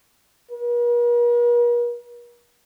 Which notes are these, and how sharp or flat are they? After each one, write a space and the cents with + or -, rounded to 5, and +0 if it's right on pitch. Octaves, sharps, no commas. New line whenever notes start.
A#4 +45